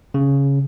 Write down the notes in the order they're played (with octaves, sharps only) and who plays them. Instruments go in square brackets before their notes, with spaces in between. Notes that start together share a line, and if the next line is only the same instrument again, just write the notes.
[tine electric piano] C#3